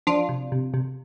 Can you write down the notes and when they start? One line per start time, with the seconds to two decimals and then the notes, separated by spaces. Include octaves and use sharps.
0.07 F3 D4 F4
0.29 C3
0.52 C3
0.74 C3